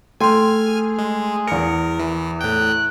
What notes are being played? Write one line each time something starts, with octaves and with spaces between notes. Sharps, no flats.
A3 G5 G#5 C6 F6
G#4
G#3
E2 A#4 C#7
E3
A2 G5 F#6